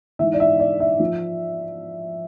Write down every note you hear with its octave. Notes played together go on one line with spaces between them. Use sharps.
G#2 E3 E5
D5
E5
D5
E5
F3